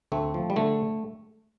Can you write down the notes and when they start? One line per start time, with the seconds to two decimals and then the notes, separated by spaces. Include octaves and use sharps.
0.12 D2 A3 C4
0.34 F3
0.50 G3
0.56 D3 A3